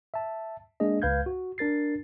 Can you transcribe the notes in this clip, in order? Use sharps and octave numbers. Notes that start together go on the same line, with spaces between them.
E5 A5
G#3 A#3 D4 G#4 D#5
C#2 B4 F5 G6 G#6
F#4
D4 A#4 A6 C7